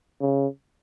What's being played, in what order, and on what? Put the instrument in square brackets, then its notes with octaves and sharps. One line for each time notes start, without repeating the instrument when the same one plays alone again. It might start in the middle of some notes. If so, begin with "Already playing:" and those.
[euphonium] C#3